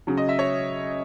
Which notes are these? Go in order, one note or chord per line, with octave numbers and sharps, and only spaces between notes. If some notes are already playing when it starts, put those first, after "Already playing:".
C#3 F#3
D#5
E5
C#5